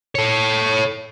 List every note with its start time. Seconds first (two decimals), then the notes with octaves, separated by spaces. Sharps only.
0.15 A4 C#5